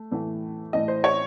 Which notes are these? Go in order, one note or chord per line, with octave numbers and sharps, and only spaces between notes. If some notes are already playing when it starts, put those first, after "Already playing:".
Already playing: A3
A2 E3 A3
A2 E3 A3 D#5
C5
C#5